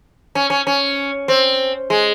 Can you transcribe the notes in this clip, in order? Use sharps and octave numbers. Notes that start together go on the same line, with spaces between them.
C#4
C#4
C#4
C4
G#3